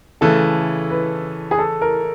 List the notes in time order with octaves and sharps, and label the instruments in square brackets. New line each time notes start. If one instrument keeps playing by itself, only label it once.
[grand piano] C#3 E3 A3 [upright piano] A4
[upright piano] B4
G#4
A4
A#4